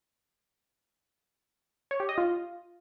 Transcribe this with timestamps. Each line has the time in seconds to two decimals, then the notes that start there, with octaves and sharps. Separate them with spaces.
1.91 C#5
2.00 G4
2.09 D#5
2.18 F4